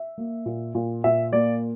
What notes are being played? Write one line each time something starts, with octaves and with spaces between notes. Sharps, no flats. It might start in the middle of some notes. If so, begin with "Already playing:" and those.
Already playing: E5
A#3
A#2
A#2
A#2 E5
A#3 D5